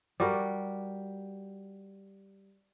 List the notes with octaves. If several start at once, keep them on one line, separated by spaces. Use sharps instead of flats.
G3 F#4 A#4